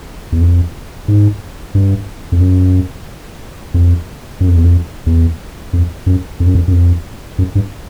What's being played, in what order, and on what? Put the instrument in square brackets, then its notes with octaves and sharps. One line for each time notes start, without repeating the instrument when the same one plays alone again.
[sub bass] E2
F2
G#2
G2
F2
F#2
F2
F#2
F2
E2
F2
E2
F2
F#2
F2
F#2
F2
F#2
F2
F#2
G2